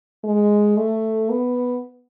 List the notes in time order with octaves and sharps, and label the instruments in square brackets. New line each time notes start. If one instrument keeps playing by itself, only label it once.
[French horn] G#3
A3
B3